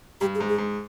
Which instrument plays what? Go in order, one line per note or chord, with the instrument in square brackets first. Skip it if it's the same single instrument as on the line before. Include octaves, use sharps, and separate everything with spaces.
[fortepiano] G2 [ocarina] G4
[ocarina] G#4
[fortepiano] G#2
[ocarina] G#4
[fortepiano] G#2